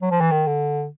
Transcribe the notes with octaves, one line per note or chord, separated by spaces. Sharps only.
F#3
F3
E3
D#3
D3